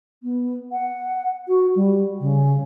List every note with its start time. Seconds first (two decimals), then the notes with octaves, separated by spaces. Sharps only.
0.23 B3
0.72 F#5
1.48 F#4
1.75 G3
2.20 C#3